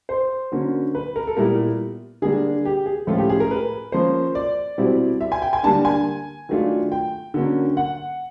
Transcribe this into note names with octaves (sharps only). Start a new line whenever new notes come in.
C5
D3 F#3 A#3 C#4
B4
A#4
A4
A#2 G3 B3 E4 A#4
D3 G3 A#3 D4 G#4
G4
G#4
A2 F3 A3 C#4 F4 A4
G4
G#4
A#4
B4
F3 A#3 C#4 C5
D5
B2 G3 C4 E4
E5
G#5
G5
G#5
D3 G3 A#3 D4 A5
G#5
D#3 F#3 A3 D4 F4
G5
D3 F#3 A#3 C#4
F#5